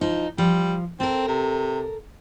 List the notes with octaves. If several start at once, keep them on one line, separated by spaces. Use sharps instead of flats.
F3 D#4
F3 G3
C4 A4 A#4
C3